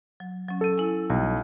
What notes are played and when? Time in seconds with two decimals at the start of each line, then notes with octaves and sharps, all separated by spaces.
0.20 F#3
0.49 F#3 C#4
0.61 A4 D#7
0.78 E4 G#5
1.10 B1 G3